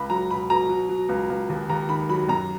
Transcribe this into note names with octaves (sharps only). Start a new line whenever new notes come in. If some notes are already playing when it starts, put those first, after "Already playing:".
Already playing: C#2 B5
F#3 A#5
B2 B5
B2 A#5
F#3
F#3
C#2
C#2
D#2
D#2 A#5
D#3 B5
F#3 B5
F#2 A#5